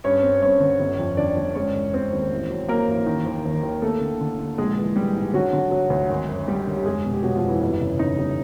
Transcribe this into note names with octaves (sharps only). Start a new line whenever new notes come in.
G2 C#4 C#5
C4
G2 C#4 C#5
D3
G1
F2
D3 D4 D5
G1
G#3 C#4 C#5
E1
E1 C4 C5
D#2
A1
F#3
F#3 A#3 A#4
A1
D#3
D#2
D#2
D#2
A3 A#3 A4
D3
D3
D3
A#1 G#3 G#4
E3
E3 G3 G4
G#2
D3 F#3 F#4
D3
F#3
D2
G#1
F#2
G#1 G3 G4
D3
G4
F1 G#3 G#4
B2
G4
B2 F#3 F#4
F3 F4
F1
E3 E4
G1
C#3
C#3 D#4
G1